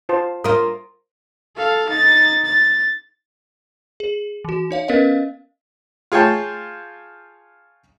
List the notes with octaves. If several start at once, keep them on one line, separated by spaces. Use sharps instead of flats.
F4 C5 A5
A#3 F4 D#6
A4 F5
D#4 A6
A6
G#4
E3 F#4
D#4 C#5 F5
B3 C#4 A#4 B4 D#5 F5
F4 G#4 C#5 G5 A5